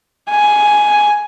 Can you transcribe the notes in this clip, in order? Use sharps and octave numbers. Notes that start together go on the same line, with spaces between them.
G#5